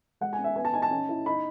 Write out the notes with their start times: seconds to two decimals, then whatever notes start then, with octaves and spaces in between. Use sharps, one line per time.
0.21 G#3 F#5
0.33 G#5
0.38 C#4
0.44 E5
0.56 B3 G#5
0.65 A5
0.74 D#4 G#5
0.82 A5
0.91 C#4
1.09 E4
1.26 D#4 B5